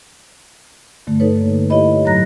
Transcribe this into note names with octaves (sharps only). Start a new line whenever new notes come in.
G2 D3 A3
D#4 A4 B4 C#5
A#3
E4 G4 C#5 D#5 B5
A2 F#3 C#5 A#5 F#6 A#6